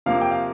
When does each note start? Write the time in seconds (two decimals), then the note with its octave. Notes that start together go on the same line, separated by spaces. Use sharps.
0.06 C3 F3 A#3 F5
0.22 G5
0.31 F5